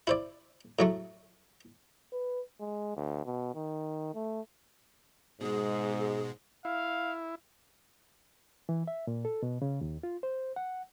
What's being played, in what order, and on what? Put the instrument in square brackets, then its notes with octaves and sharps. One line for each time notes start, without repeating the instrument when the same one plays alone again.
[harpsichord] E4 C5 D5
A2 F#3 A3
[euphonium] B4
G#3
D2
B2
D#3
A3
[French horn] G#2 [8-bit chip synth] B2 G#3 [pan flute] G#4
[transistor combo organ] E4 [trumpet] F5
[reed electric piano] E3
E5
A#2
A4
B2
C#3
D#2
F4
C5
F#5